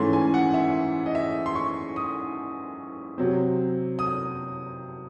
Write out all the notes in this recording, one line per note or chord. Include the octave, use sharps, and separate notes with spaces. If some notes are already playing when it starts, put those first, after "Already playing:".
Already playing: G#2 E3 A3 C#4 C6
G#5
F#5
E5
D#5
E5
C6
C#6
D#6
C3 F#3 C4
D#6